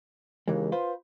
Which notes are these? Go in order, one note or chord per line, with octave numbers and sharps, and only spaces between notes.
D#2 C#3 E3 G#3
F4 B4 C5